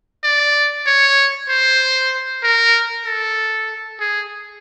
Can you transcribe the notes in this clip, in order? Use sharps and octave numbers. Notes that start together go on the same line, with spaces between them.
D5
C#5
C5
A#4
A4
G#4